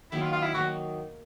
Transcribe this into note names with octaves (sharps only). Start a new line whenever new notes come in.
D#3 F#3 A#3 D#4 E4
F4
F4
E4
D#3 F#3 A#3 D#4 F#4